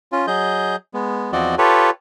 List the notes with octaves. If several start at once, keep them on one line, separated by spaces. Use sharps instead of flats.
C#4 F4
F#3 G#4 D#5 G6
G#3 B3
E2 F3 C4 F#4 D5 D#5
F4 G4 A4 B4 C#5